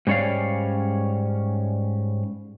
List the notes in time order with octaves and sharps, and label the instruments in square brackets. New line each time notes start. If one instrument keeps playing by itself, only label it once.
[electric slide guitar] G#2 G3 C#4 C#5 D5 F5